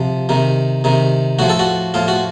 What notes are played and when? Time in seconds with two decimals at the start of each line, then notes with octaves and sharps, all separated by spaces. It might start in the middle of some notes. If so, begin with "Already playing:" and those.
Already playing: C3 F3
0.29 C3 D#3
0.84 C3 D#3
1.39 A2 F3 F#4
1.49 A4
1.59 F#4
1.94 A2 F3 F4
2.08 F#4